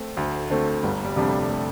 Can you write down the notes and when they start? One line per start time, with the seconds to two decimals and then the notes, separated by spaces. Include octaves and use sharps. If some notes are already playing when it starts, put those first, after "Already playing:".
Already playing: A3 C4
0.17 D2
0.50 D3 A3 C4
0.83 G1 G3 B3
1.05 G3
1.16 F2 C3 G3 D4
1.27 A3
1.49 A3